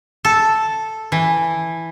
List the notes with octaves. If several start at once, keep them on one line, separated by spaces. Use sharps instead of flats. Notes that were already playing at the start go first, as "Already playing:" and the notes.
A4
E3